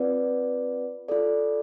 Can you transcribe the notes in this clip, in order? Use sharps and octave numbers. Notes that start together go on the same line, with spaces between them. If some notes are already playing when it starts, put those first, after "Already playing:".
Already playing: C4 F4 B4 D5
F4 A4 D5